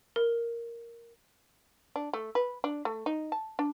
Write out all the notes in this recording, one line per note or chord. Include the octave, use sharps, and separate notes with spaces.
A#4
D4
A3
B4
D4
A3
D#4
A5
D4